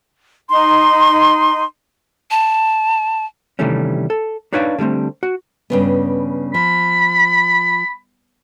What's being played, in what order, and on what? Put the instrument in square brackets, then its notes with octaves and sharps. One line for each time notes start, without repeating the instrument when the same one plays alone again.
[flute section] D#4 C6
[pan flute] A5
[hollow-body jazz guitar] C3 D#3 E3 G3 A3 C#4
A4
D4 D#4 B4 C#5 D5 F5
D3 G3 A3 C4
F#4
[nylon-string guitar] G2 C#3 B3
[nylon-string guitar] F3 [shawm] B5